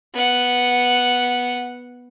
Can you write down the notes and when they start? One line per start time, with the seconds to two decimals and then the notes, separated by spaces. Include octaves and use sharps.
0.15 B3 F#5